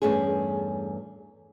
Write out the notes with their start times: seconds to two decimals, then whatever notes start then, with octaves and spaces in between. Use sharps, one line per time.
0.02 E2 G2 A3 C#4 G#4